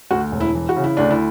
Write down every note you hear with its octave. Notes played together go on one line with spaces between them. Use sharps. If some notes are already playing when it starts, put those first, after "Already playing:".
D2 F#4
E1
E4
E3
F#4
C#3
E4
D2 D4
E4